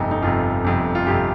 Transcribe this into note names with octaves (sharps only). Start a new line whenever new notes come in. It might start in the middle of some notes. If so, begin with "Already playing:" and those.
Already playing: G1 F2 C3 D#4
D#4
G1 F2 C3 F4
G1 F2 C3
F4
G1 F2 C3 G4